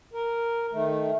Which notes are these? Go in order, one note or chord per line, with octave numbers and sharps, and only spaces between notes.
A#4
D#3 A3